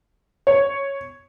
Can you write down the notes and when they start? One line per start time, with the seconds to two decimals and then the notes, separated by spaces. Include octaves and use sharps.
0.47 C#5